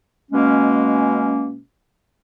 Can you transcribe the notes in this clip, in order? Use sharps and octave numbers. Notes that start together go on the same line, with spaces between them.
B2 G#3 A#3 C#4